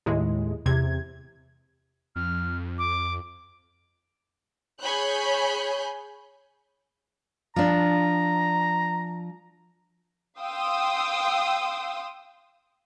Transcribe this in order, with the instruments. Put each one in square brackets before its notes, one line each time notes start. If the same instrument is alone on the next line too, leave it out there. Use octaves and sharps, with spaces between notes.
[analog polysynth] D#2 A2 G#3
E2 C3 G#6
[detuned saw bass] F2 [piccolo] F6
[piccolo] D6
[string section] G#4 C#5 G#5 B5 F#6 G6
[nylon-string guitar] F3 D4 [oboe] A#5
[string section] F5 G5 C6 D#6 E6